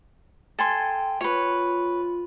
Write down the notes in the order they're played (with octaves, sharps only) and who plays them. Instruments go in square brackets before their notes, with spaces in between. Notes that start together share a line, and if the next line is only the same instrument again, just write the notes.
[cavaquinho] A4 G#5 C6 [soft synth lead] G5
[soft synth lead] F4 [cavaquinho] B4 C#5